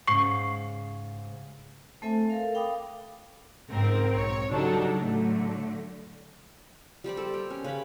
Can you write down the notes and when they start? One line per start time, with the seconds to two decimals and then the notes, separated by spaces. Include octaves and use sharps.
0.08 G#2 C#3 C#6 C7
2.02 A3 C4 A4 C5 E5 G#5
2.30 A4 A#4 F5
2.54 F5 G5 B5 D6 D#6
3.70 C#2 G#2 C4 A#4
4.13 B1 C#5
4.49 C#3 F#3 G3 D4 D#4 A4
4.96 A2 D3 F#3 A3
7.04 G3 G4 C5 D5
7.17 A4
7.34 A#4 G5
7.50 C#4
7.64 C#3 B4 C#5 B5